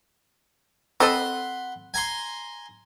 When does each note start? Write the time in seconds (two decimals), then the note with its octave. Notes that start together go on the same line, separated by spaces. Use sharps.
1.00 C4 A4 D#5 F#5 B5 C6
1.94 G#5 A#5 C6